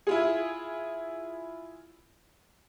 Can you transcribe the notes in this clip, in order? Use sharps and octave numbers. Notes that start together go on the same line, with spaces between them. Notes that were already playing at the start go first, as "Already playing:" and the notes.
E4 F4 G#4